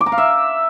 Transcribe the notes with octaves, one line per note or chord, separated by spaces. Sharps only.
D6
A#5
F5
E5